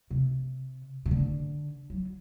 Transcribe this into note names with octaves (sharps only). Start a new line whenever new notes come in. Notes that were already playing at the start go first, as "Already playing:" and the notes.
C3
C3
D3
F#3